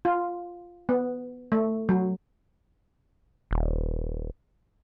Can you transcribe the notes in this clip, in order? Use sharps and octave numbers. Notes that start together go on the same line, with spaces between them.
F4
B3
A3
F#3
D#1